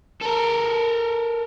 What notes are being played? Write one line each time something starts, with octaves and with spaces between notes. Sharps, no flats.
A4 A#4